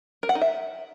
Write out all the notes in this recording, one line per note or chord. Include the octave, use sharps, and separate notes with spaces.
A#4
F#5
D#4
E5